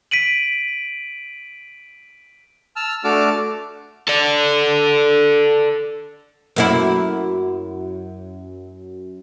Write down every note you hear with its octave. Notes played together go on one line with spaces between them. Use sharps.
B6 D7 D#7 F#7
A5 E6 F6
A3 D4 F#4 A5 D6 F6
A4 D5
F#2 A#3 E4